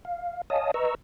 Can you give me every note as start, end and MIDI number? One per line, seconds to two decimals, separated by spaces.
0.05 0.41 77
0.50 0.71 73
0.50 0.71 75
0.50 0.71 77
0.50 0.71 80
0.50 0.71 81
0.50 0.71 87
0.74 0.95 71
0.74 0.95 75
0.74 0.95 82
0.74 0.95 85
0.74 0.95 88